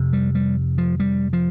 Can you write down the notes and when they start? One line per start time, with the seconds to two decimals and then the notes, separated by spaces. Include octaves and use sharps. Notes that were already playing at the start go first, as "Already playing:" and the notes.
Already playing: F2 C3
0.13 G3
0.35 G3
0.78 F3
1.00 G3
1.33 F3